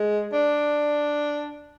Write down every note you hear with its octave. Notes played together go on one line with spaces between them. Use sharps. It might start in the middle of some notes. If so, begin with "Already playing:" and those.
Already playing: G#3
D4